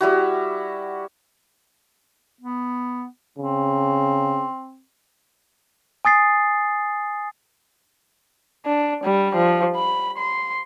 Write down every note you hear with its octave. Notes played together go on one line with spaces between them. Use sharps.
G3 E4 F#4
B3
C#3 C4
G#5 D#6 A6 C7
D4
G3
F3
B5
C6